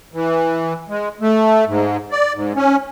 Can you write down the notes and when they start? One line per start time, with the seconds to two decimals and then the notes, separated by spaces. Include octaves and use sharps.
0.13 E3
0.89 G#3
1.21 A3
1.66 G#2
2.11 D5
2.34 G#2
2.55 C#4